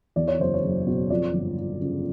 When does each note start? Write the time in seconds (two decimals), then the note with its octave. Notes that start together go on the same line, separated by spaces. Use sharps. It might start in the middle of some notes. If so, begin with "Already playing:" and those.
0.16 E2 D5
0.28 C#5
0.39 F#1 C5
0.54 C#5
0.64 F#1
0.87 B2
1.10 F2 D5
1.34 G1
1.58 F3
1.81 C#3